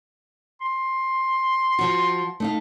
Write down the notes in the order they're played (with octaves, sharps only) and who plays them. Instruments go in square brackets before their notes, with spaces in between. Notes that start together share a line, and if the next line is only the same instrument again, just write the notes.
[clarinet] C6
[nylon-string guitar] F3 F#4
A3 D#4 F5